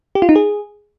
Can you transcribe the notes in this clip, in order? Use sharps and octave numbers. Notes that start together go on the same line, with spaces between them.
G4
F4
D#4
G#4